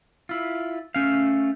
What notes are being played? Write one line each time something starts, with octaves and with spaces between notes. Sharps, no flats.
E4 F4
A3 C#4 F5